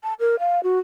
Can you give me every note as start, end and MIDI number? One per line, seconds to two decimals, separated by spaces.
0.03 0.14 81
0.20 0.39 70
0.39 0.63 77
0.63 0.79 66